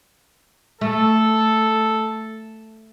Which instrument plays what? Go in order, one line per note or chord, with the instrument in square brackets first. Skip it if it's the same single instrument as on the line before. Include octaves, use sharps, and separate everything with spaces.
[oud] A3 [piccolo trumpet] A4